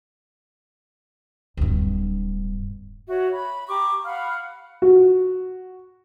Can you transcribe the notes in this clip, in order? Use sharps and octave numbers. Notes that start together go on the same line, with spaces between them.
D1 G2
F#4 C#5 E5
B5
G4 A#5 C#6 D6
F5 F#5 B5 F6
F#4